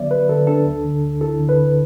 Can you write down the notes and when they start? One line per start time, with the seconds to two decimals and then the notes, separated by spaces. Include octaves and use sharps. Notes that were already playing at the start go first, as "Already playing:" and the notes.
Already playing: D3 F#3 B3 D5 E5
0.11 F#3 B4
0.29 D3 A4
0.47 D4 A4
0.65 D2
0.85 D3
1.03 D2
1.21 E4 A4
1.40 D3
1.49 B4
1.57 D3